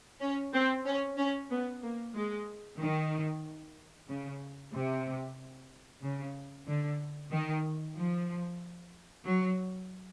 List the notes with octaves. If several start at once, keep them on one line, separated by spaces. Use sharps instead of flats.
C#4
C4
C#4
C#4
B3
A#3
G#3
D#3
C#3
C3
C#3
D3
D#3
F3
F#3